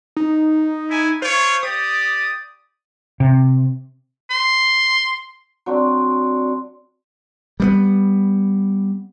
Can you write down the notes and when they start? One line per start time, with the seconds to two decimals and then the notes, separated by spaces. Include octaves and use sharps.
0.17 D#4
0.90 E4 G#5
1.22 F4 C5 C#5
1.63 G4 D5 D#6
3.20 C3
4.31 C6
5.66 F#3 C4 D4
7.60 G3 A3 B3